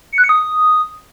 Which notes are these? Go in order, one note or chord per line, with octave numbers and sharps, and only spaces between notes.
C#7
F#6
C#7
D#6